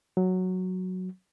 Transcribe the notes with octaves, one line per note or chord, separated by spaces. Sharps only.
F#3